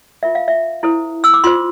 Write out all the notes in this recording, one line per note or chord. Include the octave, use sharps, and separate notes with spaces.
F4 A#4 E5
F5
E5
E4 A4 C5
E6
D6
F4 C5 C6